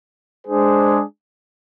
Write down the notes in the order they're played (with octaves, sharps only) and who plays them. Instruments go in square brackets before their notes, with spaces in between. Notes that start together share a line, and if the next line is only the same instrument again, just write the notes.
[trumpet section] G#3 D4 G#4 C5